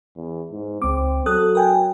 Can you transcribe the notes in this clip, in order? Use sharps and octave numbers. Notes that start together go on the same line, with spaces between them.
E2
G#2
C#2 C4 D6
F#3 A4 D#6 F#6
A#4 G5 G#5